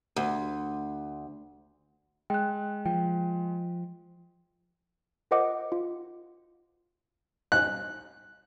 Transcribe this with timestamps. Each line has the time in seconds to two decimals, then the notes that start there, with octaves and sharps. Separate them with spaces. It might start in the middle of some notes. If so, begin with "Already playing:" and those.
0.16 D2
2.30 G#3 G5 F#6
2.86 F3 G5
5.31 F4 A#4 C5 D#5 F#5 D6
5.72 F4
7.52 F#6